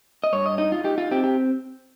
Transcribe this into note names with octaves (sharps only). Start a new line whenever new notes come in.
D#5
G2 C#5
D#5
D#4 D#5
F4
D#4 G4
F4
C4 G4
G4